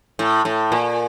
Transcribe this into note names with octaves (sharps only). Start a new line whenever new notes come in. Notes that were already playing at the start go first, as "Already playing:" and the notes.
A2
A2
A#2